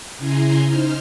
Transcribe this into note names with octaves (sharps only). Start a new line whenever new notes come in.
C#3 E4 G#5 A#5 C6
D#4 C5 F6